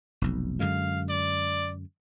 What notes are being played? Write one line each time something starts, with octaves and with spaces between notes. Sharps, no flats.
F1 B1
F#2 D3 G#3 F5
D5